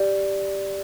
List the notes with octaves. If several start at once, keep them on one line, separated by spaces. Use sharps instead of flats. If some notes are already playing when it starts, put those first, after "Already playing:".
Already playing: G4 D5